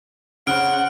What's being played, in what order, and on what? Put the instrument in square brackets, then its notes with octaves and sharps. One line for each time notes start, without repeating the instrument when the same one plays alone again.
[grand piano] C#3 C5 [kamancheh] F#5 [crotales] F6 D7